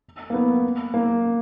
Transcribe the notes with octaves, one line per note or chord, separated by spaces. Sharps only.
A#3
B3
A#3